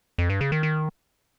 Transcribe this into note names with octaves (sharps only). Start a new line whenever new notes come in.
F2
G2
C#3
D#3
D#3